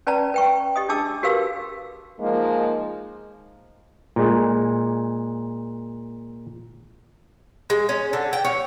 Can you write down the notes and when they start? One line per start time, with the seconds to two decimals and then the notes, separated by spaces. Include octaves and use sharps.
0.07 C#4 B4 D5 A5 A#5
0.34 B4 G5 C#6
0.76 G4 D#5 D#6
0.89 D4 G#4 A5 D6 E6
1.23 F#4 G4 A#4 B4 F5 E6
2.20 F3 G#3 A#3 D#4
4.16 A#2 G#3
7.70 G#3
7.89 C#4
8.13 D3
8.33 G5
8.45 C#5